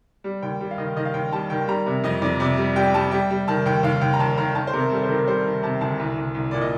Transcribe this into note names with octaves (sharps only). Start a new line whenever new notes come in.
G3
D#2 G5
G3
F5
D#3 D#5
D#3 D#5
F5
D#2 G5
G3 A5
D#3 G5
G3 A#5
C3
F2 D#5
F2 D5
C3 D5
G3
G3 G5
G3 A5
G3 G5
G3
D#3 A5
D#2 G5
D#2 F5
D#2 G5
A#5
D#2 A5
D#3 A#5
D#3 A5
C5
C3 A#4
G3 A4
C5
D#3 A#4
G3 C5
D#3
C3 A5
D2 A5
C2
C2
C2
A#2 D5
D#5